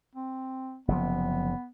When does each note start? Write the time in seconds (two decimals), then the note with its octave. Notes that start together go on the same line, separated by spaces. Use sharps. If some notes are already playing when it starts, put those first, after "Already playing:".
0.15 C4
0.88 F#1 C3 F3 B3